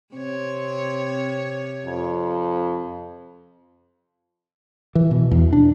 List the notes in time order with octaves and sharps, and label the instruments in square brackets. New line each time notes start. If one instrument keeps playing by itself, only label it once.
[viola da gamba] C3 C#5 [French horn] C4
[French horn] F2
[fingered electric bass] E3
B2
E2
D4